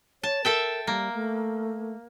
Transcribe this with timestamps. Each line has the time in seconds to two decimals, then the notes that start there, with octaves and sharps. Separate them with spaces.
0.23 C#5 A5
0.45 A4 A#4 E5 G5
0.87 G3 A#3
1.14 A3